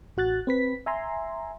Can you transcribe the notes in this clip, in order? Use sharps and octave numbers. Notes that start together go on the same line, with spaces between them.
A1 F#4 F#6 A6
C4 B4 B6
E5 G#5 A#5 C6